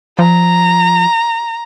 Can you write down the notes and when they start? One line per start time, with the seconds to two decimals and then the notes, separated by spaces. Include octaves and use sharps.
0.19 F3 A#5